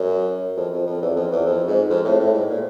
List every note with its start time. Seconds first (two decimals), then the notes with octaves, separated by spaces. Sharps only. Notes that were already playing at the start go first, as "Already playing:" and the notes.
Already playing: F#2
0.57 F2
0.73 F2
0.87 F2
1.02 E2
1.16 F2
1.32 E2
1.46 F2
1.67 G#2
1.89 F2
2.05 A2
2.20 A2
2.34 G#2
2.49 A#2